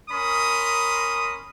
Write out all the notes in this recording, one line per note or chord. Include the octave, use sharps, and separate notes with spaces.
C#4 A#4 B5 C6 D#6